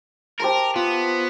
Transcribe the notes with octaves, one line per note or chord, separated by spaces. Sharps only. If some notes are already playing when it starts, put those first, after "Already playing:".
G4 A#4 C5 A5
B3 F4